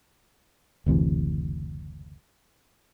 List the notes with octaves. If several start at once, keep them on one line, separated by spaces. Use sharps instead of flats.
F#1 D2 C3 E3